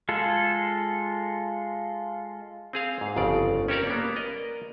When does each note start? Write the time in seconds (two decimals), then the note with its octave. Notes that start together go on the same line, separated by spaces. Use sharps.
0.09 G#3 F4 A4
2.73 C4 G#4 F5
3.01 G#2
3.16 G1 F2 C#3 D5
3.68 C#4 G4 A4 A#4 C#5 D5
3.87 A#3 B3
4.16 A#4 D5 D#5